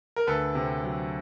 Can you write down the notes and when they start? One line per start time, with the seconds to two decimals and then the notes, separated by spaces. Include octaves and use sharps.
0.16 A#4
0.27 D2 A4 B4
0.55 C3
0.84 F#3